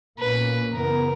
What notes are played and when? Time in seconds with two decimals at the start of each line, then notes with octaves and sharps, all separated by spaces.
0.19 B1 A#2 A#3 C#4 B4
0.74 F#2 C#3 E3 B3 A#4